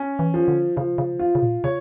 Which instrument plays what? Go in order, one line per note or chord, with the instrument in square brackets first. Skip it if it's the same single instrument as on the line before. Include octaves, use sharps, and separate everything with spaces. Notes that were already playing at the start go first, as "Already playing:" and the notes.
Already playing: [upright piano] C#4
[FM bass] E3
[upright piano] F3
[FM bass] D3
[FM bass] C#3 [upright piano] F3
[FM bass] C#3
[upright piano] F4
[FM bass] C#3
A#2
[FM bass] C#3 [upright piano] C#5